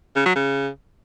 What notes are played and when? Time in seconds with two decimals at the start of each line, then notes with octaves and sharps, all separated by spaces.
0.16 C#3
0.26 F#3
0.35 C#3